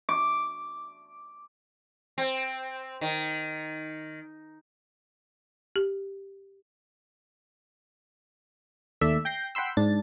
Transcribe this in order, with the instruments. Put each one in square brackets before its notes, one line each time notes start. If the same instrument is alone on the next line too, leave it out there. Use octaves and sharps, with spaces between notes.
[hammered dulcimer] D6
[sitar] C4
D#3
[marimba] G4
[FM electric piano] D#2 A3 D5 E5
G5 G6 A#6 C7
F#5 G5 B5 C6 E6
G#2 D4 A6